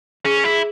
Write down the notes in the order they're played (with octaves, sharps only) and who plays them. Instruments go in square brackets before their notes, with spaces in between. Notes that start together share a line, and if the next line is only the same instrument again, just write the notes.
[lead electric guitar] C#4 [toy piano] G#4
[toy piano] A#4
[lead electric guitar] E4 [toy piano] G#4